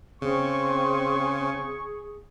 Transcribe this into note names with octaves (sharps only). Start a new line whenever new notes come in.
C#3 C4 G#4 C#6